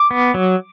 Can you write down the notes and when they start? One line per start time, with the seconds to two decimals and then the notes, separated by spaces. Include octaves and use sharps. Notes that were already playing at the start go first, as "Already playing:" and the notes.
Already playing: D6
0.11 B3
0.34 F#3